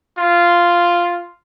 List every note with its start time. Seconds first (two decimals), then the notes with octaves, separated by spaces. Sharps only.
0.18 F4